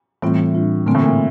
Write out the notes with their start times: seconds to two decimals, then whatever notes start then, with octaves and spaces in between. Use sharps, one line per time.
0.22 A2 E3 G3 C4 F4
0.55 A2 G3 D4 F4
0.86 A#2 D3 A3 C4
0.95 A2
1.04 A#2